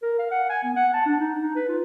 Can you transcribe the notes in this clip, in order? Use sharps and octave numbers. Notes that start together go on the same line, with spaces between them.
A#4
F5
F#5
G#5
B3
F#5
A5
D4
D#4
D#4
B4
F4